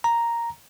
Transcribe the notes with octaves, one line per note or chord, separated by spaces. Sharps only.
A#5